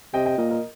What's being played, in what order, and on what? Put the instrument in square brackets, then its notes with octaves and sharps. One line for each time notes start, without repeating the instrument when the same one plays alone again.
[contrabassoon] C3 [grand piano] D#5 G5
[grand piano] D#5 G5
[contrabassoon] A#2 [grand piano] A#4 D#5
[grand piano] A#4 D#5